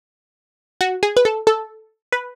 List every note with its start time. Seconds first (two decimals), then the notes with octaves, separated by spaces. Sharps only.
0.81 F#4
1.03 G#4
1.17 B4
1.25 A4
1.47 A4
2.12 B4